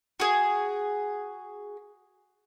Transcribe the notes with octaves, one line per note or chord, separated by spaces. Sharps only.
F#4 G#4